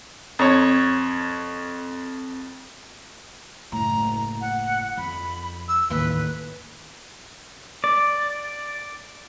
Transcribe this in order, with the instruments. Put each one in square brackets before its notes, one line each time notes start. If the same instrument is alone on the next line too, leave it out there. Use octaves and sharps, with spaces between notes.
[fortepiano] F2 C#5
[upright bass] F#1 A2 [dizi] A#5
[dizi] F#5
[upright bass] F2 [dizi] B5
[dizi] E6
[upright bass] A1 D#2 [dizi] B4
[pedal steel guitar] D5